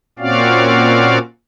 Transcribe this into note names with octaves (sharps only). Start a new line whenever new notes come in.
A#2 C4 C#4 F#4 D5 F5